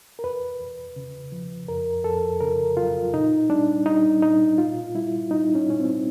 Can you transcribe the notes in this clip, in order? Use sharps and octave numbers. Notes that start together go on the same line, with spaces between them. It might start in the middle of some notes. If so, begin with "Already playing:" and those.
A#4
E2 B4
E2
C#3
F3
F2 A#4
F2 A4
C#3 A#4
F#3 F4
A#2 D#4
G3 D4
G3 D#4
A#2 D#4
A#2 F4
G3 E4
G3 D#4
C#4
A#2 C#4
C4